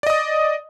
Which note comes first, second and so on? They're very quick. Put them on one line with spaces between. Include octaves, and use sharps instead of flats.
D5 D#5 D#6